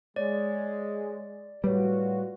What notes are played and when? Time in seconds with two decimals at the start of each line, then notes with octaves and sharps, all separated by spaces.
0.16 G#3 C#5 D5
1.64 A2 G3 F4 F#4 B4 C#5